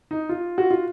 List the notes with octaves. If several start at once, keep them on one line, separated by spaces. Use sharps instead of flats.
D#4
F4
F#4
F4